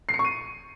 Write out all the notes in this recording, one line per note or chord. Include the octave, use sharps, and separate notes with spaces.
C7
C#7
C#6
D#7